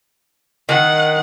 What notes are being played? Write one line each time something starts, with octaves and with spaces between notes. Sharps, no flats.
D#3 F#5